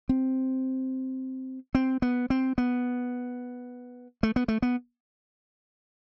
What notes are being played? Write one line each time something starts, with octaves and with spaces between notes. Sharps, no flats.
C4
C4
B3
C4
B3
A3
B3
A3
B3